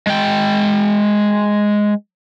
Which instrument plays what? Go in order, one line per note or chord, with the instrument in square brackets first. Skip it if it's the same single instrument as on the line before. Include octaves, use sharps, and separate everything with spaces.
[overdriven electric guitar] G#3 G5